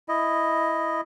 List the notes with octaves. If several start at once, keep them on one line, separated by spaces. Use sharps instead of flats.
E4 D#5